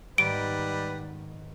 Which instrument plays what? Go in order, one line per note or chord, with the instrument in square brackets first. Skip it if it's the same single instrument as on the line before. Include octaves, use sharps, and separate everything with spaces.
[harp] G#2 D#3 B3 [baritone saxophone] G3 [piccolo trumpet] B4 [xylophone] D7